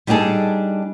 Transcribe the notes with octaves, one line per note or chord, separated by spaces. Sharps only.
G3 D4 D#4 F#4 G#4 A4